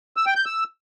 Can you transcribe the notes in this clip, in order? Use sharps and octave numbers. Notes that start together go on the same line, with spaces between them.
E6
G5
G6
E6